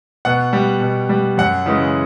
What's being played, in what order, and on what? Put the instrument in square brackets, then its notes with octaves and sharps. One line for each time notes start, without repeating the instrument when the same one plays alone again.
[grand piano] B2 F#5
G3
B2
G3
F#2 F#5
C#3 E3 G#3